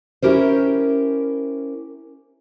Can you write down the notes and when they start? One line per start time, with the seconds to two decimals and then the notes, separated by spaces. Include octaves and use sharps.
0.22 C#4 E4 G4 A#4 C5